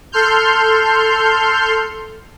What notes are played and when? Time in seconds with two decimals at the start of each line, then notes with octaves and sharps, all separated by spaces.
0.12 A4 C6 F6 G6